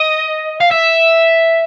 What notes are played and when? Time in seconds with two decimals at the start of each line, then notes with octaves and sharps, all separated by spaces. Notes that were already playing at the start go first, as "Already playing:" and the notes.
Already playing: D#5
0.60 F5
0.71 E5